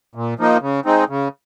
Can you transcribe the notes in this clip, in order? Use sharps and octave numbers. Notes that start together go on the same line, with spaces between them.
A#2
F3 A#3 D#4
C#3
G#3 C4 D#4
C#3